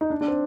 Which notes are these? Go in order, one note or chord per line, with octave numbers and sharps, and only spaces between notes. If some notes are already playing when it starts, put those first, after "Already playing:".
D#4
D4
D4
C4